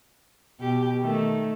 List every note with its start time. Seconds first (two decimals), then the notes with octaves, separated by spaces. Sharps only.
0.59 B2 G4
1.02 D#3 A3